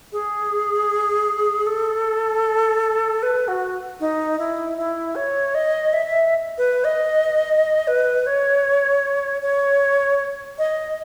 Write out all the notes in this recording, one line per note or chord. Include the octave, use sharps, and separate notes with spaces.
G#4
A4
B4
F#4
D#4
E4
E4
C#5
D#5
E5
B4
D#5
B4
C#5
C#5
D#5